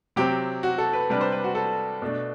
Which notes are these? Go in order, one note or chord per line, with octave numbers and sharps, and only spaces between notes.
C3 F#3 C4 G4
F#4
A4
B4
C3 G3 D4 B4
C5
B4
F#4
A4
B2 A3 D4